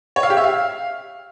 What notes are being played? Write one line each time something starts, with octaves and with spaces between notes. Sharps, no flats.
C#5
F5
G4
E5
F5